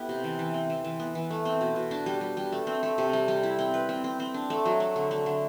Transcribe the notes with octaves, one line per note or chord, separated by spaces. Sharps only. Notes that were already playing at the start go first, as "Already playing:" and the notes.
Already playing: A3 B3 E4 G4
C3
E3
E3
C4
E3
E3
B3
E3
A3
C4
B2
B2
D4
G3
G3
G3
A3
C4
A3
C3
G3
G3
E4
C4
B4
C4
C4
C4
D4
A3
F#3
A3
D3
A3
D3